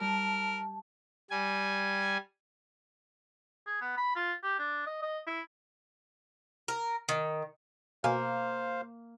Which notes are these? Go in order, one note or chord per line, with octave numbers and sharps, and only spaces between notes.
G3 A#4 A5
G3 G#5
G#4
B3
B5
F4
G4
D4
D#5
D#5
E4
A#4
D#3
B2 A#3 C5 F5 G#5 F6